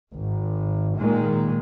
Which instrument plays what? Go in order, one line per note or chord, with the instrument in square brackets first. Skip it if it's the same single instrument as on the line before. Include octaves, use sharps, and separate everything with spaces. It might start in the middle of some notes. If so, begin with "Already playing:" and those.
[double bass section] G#1
A#2 D#3 G#3